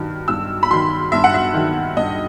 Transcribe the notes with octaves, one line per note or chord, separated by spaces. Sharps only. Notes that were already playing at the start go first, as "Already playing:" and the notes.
Already playing: G2 D#3 F#3
G2 E6
B5
D#3 F#3 C6
G2 E5
F#5
E5
D#3 F#3
G2 D#5